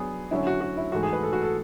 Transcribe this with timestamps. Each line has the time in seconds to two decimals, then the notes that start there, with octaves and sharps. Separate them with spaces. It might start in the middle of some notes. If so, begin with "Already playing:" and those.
Already playing: F#3 B3 D4 G#4
0.31 D3 F#3 C#4 E4
0.47 F#4
0.61 F#4
0.77 E4
0.92 G#2 E3 A3 F#4
1.03 G#4
1.13 B4
1.23 A4
1.33 F#4
1.43 A4